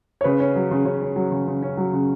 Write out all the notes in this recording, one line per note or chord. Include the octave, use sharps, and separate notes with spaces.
C#5
C#3 B4
C#4
F#3
C#3
C#3 C#5
C#4
F#3
C#3
C#3
C#4
F#3
C#3